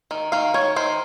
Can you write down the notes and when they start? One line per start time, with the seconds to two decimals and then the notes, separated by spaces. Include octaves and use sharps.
0.11 D#3
0.32 D#3 F5
0.54 D#3 C#5
0.76 D#3 C5